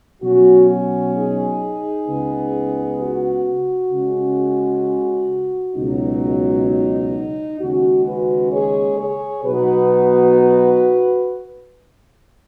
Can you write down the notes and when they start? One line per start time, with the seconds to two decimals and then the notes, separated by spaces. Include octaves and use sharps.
0.22 B2 F#3 C#4 F#4
0.69 F#4
1.15 D#4 G#4
2.07 C#2 C#3 B3
2.99 F#4
3.92 C#3 G#3 C#4
5.76 C#2 B2 F#3 D#4
6.68 D#4
7.60 D#2 C#3 G#3 C#4 F#4
8.06 F#4 B4
8.52 G#4 C#5
8.98 G#4 C#5
9.45 B2 F#3 B3 D#4 F#4 B4